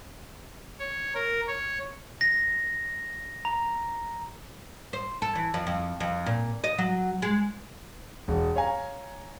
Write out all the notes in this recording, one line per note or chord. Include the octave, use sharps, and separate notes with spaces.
C#5
A#4
C#5
A#6
A#5
C5
A4
E3
F2
F2
F2
A#2
D#5
F#3
G#3
E1
C#5 F5 G#5 A#5